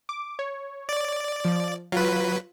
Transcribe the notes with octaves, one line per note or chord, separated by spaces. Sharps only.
D6
C#5
D5
F3
F#3 F4 B4